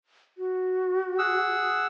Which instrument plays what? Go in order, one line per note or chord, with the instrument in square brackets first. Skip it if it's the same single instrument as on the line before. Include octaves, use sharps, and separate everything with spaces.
[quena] F#4
[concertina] G#4 F#5 E6